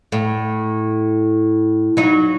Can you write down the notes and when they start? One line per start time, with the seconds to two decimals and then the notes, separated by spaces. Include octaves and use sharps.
0.12 A2
1.97 F#3 D#4